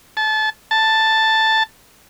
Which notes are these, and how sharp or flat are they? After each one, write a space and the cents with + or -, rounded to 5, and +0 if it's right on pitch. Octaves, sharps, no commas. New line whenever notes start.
A5 -25
A5 +5